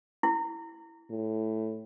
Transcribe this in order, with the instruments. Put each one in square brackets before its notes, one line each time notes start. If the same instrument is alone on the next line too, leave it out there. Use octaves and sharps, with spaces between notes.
[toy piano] E4
[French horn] A2